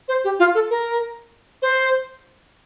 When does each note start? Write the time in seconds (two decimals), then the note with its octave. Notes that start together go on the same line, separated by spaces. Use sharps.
0.08 C5
0.24 G4
0.39 F4
0.55 A4
0.70 A#4
1.62 C5